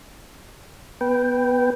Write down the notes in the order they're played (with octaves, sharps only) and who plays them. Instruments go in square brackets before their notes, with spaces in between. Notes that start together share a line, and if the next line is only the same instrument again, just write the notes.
[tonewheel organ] B3 B4 G5